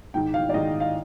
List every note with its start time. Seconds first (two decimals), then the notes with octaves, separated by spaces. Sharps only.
0.14 G#2 D#3 G5
0.34 F5
0.49 D5
0.54 G#2 D#3 D#5
0.80 F5